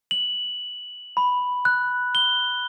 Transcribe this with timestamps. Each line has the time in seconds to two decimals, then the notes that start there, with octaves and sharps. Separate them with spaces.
0.11 F#7
1.17 B5
1.65 F#6
2.15 G7